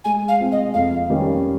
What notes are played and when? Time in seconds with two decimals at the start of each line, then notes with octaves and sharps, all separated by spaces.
0.05 G#3 G#5
0.28 F5
0.40 C4 F4
0.52 D#5
0.74 F2 F5
1.10 D#3 G3 C#4